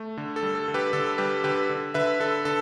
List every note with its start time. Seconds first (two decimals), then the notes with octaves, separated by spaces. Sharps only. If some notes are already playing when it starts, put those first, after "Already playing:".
Already playing: A3
0.17 D3
0.36 A4
0.43 G3
0.55 A4
0.68 D3
0.74 G4 B4
0.93 D3 A4
1.18 G3 G4 B4
1.44 D3 G4 B4
1.69 D3
1.94 D3 B4 E5
2.19 D3 A4
2.45 D3 A4